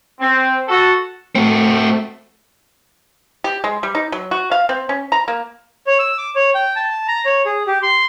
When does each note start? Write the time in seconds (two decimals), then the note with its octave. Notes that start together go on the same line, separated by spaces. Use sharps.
0.20 C4
0.68 F#4 A4
1.35 A3 C4 F#4
3.44 G4
3.64 G#3
3.83 G3
3.95 D#4
4.12 F#3
4.31 F#4
4.51 F5
4.69 C4
4.89 C#4
5.12 A#5
5.28 A#3
5.87 C#5
5.99 E6
6.18 D6
6.36 C#5
6.55 G5
6.76 A5
7.08 A#5
7.25 C#5
7.46 G#4
7.67 G4
7.83 C6